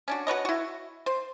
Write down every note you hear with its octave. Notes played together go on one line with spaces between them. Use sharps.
C#4 D4 F#4
F#4 B4 C#5 D#5
E4 F#4
C5